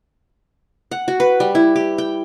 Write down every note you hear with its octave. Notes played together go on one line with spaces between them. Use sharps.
F#5
F#4
B4
G3
E4
G4
G5